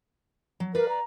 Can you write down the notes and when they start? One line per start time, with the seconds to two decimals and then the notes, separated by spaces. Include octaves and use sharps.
0.60 F#3
0.75 A#4 B4 D5 F5
0.89 A#5